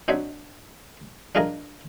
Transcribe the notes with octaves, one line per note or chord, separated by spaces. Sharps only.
C4 D4 D#4 F#4 C#5 B5
D4 F4 G#4 A#4 D#5 A#5